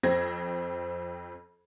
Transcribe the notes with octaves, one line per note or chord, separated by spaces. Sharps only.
F2 C4 G#6 A#6